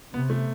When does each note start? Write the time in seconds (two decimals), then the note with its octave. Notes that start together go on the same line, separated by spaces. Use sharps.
0.14 C3 B3
0.30 A3